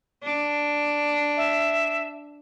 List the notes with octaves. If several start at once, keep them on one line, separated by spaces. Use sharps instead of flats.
D4
E5